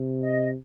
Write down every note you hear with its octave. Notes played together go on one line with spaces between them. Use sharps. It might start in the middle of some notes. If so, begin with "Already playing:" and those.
Already playing: C3
D#5